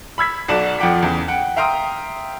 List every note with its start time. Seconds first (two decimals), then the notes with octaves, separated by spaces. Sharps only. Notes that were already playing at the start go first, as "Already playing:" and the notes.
0.18 B5 E6 G#6 B6
0.48 B1 F#4 D5 A5 E7
0.79 F2 F3 F#5 G5 D6 B6
1.02 E2 C#3
1.28 F#5 G5
1.56 E5 F5 G5 A#5 C6 D#6